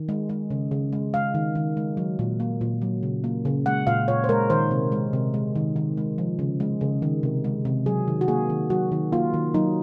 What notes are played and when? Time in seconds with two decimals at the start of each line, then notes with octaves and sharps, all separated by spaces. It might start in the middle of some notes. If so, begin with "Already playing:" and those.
Already playing: D#3
0.09 G#3
0.29 G#3
0.50 C#3
0.71 C#3
0.92 G#3
1.14 G#3 F5
1.35 D#3
1.55 D#3
1.77 G#3
1.97 F#3
2.19 A#2
2.40 A#3
2.61 A#2
2.82 F#3
3.03 C#3
3.24 A#3
3.45 C#3
3.66 G#3 F#5
3.87 A#2 F5
4.08 A#2 C#5
4.24 C5
4.29 G#3 A#4
4.50 D#3 C5
4.71 C3
4.92 G#3
5.13 C3
5.34 G#3
5.56 D#3
5.76 D#3
5.97 G#3
6.18 F3
6.39 C#3
6.60 G#3
6.81 C#3
7.02 D#3
7.23 C3
7.44 G#3
7.65 C3
7.86 F#3 G#4
8.08 D#3
8.21 F#4
8.28 A#3 G#4
8.50 D#3
8.70 F#3 F#4
8.92 D#3
9.12 A#3 F4
9.34 D#3
9.54 F#3 D#4